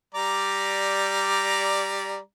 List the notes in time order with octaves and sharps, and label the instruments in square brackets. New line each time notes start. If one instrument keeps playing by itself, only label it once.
[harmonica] G3 D5 A#5